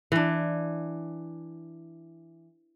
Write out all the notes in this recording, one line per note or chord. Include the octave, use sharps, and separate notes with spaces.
E3 D4